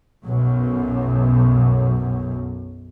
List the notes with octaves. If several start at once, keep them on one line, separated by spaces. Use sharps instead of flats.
B1 F#2